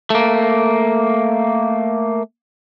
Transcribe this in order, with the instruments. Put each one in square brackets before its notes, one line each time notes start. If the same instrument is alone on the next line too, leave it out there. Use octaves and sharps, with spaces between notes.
[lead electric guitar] A3 A#3